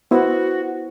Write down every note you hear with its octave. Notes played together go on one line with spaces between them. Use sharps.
B3 E4 F#4 C5